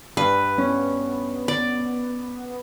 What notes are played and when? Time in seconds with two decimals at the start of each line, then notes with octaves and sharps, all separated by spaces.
0.17 G2 B4
0.58 B3 C#4
1.48 D5